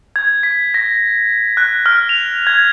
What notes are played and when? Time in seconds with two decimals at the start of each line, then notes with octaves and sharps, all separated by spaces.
0.16 G#6
0.43 B6
0.74 A#6
1.57 F#6
1.86 F6
2.09 F7
2.47 G#6